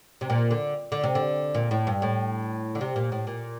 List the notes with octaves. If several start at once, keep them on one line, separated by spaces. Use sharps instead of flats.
C3
A#2
D3
D3
C3
D3
A#2
A2
G2
A2
D3
C3
A#2
A2
A#2